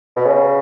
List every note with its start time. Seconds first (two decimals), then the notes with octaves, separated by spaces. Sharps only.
0.16 B2
0.26 C#3